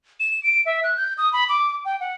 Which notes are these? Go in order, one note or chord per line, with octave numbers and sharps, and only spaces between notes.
E7
D7
E5
F#6
G6
D#6
B5
D6
G5
F#5